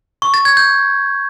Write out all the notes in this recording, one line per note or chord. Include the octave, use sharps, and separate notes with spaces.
C#6
A6
G#6
G6